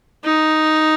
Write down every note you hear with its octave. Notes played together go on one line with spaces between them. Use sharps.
D#4